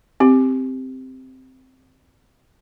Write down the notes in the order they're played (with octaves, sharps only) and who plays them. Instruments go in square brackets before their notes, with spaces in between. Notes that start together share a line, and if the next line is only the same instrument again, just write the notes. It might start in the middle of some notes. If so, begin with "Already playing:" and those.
[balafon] C4 G4